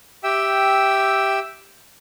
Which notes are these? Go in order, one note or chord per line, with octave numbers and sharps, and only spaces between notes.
G4 E5 G5 E6